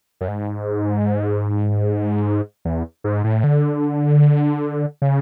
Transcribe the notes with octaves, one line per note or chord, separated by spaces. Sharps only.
F#2
G#2
E2
G#2
A2
D3
C#3